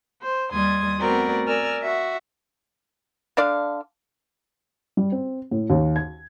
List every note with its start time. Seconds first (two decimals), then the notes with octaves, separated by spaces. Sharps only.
0.22 C5
0.51 D#2 G3 C6 D#6 G#6
0.99 A3 B3 C4 F#4 A#4 D5
1.46 A#4 D5 G#5 E6 F6
1.81 F#4 E5
3.37 D3 D4 D5 F5
4.97 G3
5.12 C4
5.51 A2
5.70 D#2
5.96 G#6